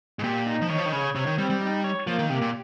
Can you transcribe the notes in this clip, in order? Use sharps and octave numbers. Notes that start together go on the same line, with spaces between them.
G#2
A#2 G4
D#4
F3
D#3 C#5
F3
D#3
C#3 C#5
C3 C#5
D#3
G3 C4
G3
D#4
C#5
F3 A#3
D#3
C3 G4
A#2